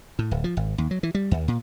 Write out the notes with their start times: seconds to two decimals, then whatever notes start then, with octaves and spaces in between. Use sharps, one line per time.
0.19 A2
0.31 D1
0.44 F3
0.57 G#1
0.78 D#2
0.91 F#3
1.03 E3
1.15 G3
1.31 D#2
1.48 A#2